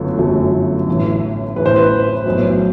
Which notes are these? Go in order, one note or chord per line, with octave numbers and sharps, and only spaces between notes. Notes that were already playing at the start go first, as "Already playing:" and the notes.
Already playing: G1 F#2 F#3 A3
G1 F#2 F#3 A3
A1 A2 E3
A1 A2 E3 B4
C5
B4
B1 A2 F#3